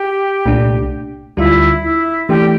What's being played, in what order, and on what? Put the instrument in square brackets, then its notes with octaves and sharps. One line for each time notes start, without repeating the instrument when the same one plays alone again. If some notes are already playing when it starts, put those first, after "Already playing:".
Already playing: [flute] G4
[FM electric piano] C2 A#2 A3 D4
[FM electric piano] D2 D3 G3 D4 F4 [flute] E4
[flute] E4
[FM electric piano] E3 A3 D4 [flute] G4